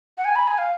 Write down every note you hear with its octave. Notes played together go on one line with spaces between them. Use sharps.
F#5
G#5
B5
G#5
F5